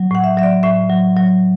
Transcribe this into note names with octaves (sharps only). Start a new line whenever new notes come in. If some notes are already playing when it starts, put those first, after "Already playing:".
Already playing: F#3
A2 F#5
E5
F#3 E5
D5
A2 E5
F#3
F#3